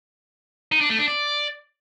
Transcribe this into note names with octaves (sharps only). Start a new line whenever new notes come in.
D#4
D4
A3
D4
D5